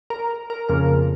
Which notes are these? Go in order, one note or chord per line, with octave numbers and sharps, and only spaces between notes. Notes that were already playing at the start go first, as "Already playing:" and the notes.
A#4
A#4
F2 C#3 F3 A#3 A#4